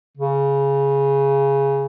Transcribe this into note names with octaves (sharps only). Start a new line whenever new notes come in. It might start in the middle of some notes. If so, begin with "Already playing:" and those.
C#3